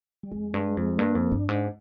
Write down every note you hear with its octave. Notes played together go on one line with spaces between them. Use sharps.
G3
F2 G#3
G2
F2
G2 A#3
F2
G2 D4
G#2